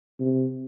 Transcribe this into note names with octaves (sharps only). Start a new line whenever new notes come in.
C3